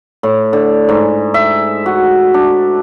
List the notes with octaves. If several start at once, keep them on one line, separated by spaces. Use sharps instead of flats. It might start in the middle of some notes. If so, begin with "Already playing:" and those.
A2
D3
G#2
E5
F#4
D4